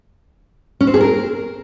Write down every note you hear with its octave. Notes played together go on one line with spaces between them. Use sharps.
C#4
C4
G#4
A#4